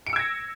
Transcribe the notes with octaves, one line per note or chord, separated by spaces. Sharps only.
E6 G#6 A#6 C#7 D7